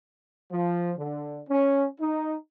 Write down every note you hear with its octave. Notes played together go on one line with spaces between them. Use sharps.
F3
D3
C#4
D#4